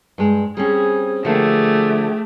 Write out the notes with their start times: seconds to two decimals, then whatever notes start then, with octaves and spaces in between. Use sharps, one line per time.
0.18 G2 G#3
0.57 G3 C4 C#4 G#4
1.25 D3 F3 A3 A#3 G4 G#4